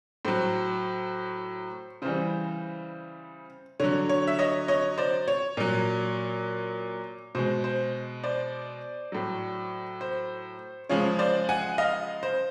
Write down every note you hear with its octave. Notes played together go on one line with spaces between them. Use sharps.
A2 F#3 C5
C#3 E3 G3 C5
D3 F#3 C#5
C#5
E5
C#5 D#5
C#5 D#5
C5 D5
C#5
A#2 F#3
B2 G#3 C5
C5
C5 D5
A2 F#3
C5
C#3 F3 G#3 C#5
C5 D5
F#5 G#5
D#5 F5
C5